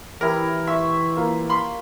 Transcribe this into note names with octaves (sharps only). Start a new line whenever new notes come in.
E3 E4 G4 A#4
E5 C6 C#6 E6
A#3 F4
B5 C6